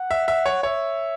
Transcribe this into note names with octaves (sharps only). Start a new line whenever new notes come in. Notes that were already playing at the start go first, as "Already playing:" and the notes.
Already playing: F#5
E5
E5
C#5
C#5 E5